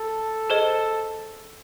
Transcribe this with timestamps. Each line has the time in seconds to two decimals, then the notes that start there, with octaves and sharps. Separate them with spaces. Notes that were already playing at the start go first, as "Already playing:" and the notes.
Already playing: A4
0.50 G#4 C5 D#5